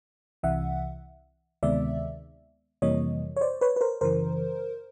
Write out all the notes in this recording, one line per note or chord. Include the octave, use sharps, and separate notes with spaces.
C2 C3 E3 E5 F#5
D2 C3 D#3 G#3 B3 D5 E5
F2 C3 E3 G3 A#3 C#5 D#5
C#5
C5 D5
B4 C#5
B4
A#4 C5
F#2 C#3 E3 A#4 C5